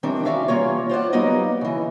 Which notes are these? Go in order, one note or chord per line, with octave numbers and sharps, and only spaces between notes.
D#3 E3 G3 C4 D4
C#4 F#4 D5 E5 F5
E3 G3 A#3 F4 C#5
F4 C5 D5 F#5
F#3 G3 A#3 B3 D#4 D#5
C#3 E3